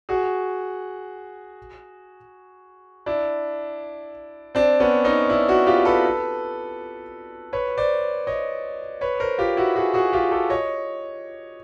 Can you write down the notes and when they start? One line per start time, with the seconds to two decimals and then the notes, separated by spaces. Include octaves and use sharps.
0.09 F#4 G#4
3.06 D4 E4
4.55 C4 D4
4.80 B3 C#4
5.05 C#4 D#4
5.29 D4 E4
5.48 E4 F#4
5.67 F4 G4
5.85 A4 B4
7.53 B4 C#5
7.77 C5 D5
8.27 C#5 D#5
9.01 B4 C#5
9.20 A#4 C5
9.38 F4 G4
9.57 E4 F#4
9.76 F#4 G#4
9.94 F#4 G#4
10.13 F4 G4
10.31 G4 A4
10.50 C#5 D#5